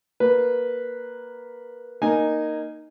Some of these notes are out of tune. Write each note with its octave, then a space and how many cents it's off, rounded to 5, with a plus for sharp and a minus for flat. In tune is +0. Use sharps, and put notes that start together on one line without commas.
A#3 +5 B4 +0
A#3 +0 D#4 -10 G#5 +0